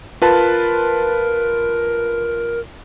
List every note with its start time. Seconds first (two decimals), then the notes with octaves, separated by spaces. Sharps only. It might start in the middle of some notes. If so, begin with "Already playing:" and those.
0.22 F4 A#4 B4 A5